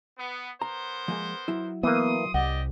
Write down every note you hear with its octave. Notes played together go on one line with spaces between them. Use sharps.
B3
B3 A#4 C5 A#5
F3 G#3 A#3
F#3 E4
E3 A#3 B3 C6 D#6
C2 G4 D5 D#5 F#5